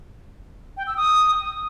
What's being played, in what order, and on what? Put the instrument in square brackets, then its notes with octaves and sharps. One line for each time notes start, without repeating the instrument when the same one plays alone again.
[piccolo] G5
E6
D#6